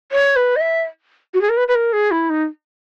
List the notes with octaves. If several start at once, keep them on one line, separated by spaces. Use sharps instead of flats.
C#5
B4
D#5
E5
F#4
G#4
A#4
B4
B4
A#4
G#4
E4
D#4